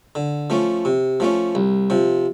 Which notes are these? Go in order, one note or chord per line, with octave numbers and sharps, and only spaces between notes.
D3
F3 A3 C#4
C3
F3 A3 C#4
C2
C3 F3